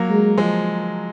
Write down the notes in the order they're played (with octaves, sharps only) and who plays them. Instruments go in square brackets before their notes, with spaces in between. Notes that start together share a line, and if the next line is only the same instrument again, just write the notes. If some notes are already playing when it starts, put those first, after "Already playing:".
Already playing: [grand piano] F#3 A#3
[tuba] G#3
[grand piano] F3 G#3